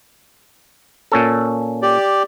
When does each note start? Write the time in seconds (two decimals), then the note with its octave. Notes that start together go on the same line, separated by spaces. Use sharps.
1.12 A#2 C#4 A4
1.82 G4 D5